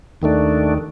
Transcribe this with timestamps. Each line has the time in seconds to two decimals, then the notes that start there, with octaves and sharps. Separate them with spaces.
0.22 D#2 D#3 A3 D4